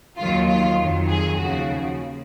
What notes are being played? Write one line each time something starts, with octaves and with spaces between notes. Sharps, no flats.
D#2 D#3 F#3 F4
F4
F2 D#3 F#3
G#4
D#2 C#3 F3 F#4